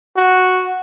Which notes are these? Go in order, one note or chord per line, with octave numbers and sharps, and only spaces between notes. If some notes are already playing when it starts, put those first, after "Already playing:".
F#4